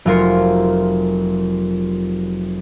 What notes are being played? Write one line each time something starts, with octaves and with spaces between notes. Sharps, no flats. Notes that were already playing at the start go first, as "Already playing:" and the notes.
F1 F#3 F4 A#4 C6 C#7